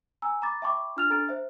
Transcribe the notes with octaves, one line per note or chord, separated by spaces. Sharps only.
G#5 A#5 E6
A#5 B5 D6 A6
E5 G5 A5 B5 C#6 D6
D4 F4 F6 A6 F7
D4 A4 A#5 F6 A6 D7
C5 E5